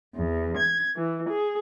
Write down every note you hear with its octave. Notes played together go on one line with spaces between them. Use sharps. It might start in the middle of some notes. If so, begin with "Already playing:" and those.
E2
G#6
E3
G#4